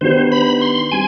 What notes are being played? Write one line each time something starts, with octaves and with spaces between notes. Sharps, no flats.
D#3 B3 D4 G4 B4 C5
B5
C6
G3 C4 G#5